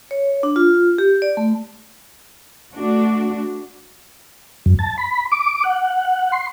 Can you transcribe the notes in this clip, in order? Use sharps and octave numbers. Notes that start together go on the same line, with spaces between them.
C#5
D4
F4
G4
D5
A3
A3 D4 F#4
F#2
A5
B5
D6
F#5
C6